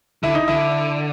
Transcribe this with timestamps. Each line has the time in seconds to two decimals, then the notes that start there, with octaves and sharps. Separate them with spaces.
0.23 D3 E4
0.35 D#4
0.48 D3 E4